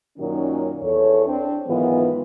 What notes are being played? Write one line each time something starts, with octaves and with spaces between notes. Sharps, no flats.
F#2 A#2 D#3 F#3 C#4 D#4
E2 A4 C#5
C4 D4
G#2 D#3 E3 F#3 B3 F4